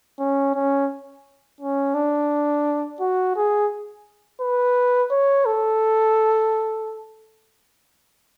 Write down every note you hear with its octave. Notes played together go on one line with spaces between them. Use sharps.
C#4
C#4
C#4
D4
F#4
G#4
B4
C#5
A4